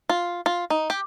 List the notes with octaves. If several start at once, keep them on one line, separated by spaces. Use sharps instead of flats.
F4
F4
D#4
G4